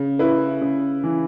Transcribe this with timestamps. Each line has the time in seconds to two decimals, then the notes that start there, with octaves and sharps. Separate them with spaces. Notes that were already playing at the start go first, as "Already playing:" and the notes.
Already playing: C#3
0.19 E4 B4
0.61 C#3
1.04 E3